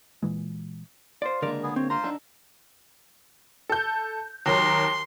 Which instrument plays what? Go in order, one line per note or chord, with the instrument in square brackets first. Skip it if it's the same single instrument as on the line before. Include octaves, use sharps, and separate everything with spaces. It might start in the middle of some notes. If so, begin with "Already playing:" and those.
[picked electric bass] A#2 E3 G#3
[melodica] F4 [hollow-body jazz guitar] C5 D5
[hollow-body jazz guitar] C#2 A#4 D5 [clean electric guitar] D3 G#3 A#3
[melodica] B3 G#4
[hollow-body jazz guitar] C4 [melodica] C#5
[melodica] F4 C5 C6 [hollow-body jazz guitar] A#5
[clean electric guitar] D4 D#4 A4
[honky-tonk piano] A4 G6
[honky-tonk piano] D#2 F#3 A#4 [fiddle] C6